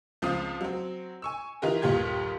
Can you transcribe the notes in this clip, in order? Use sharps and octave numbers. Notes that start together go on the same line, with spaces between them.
C#2 F3 C4 F5 D#6
F#3 C4
G#5 C#6 E6
E3 D#4 F4 G4 A#4
G1 D#2 A#2 F4 G4 G#6